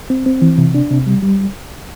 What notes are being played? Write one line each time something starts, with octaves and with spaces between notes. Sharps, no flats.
C4
C4
E3
C3
D4
C3
G3
G3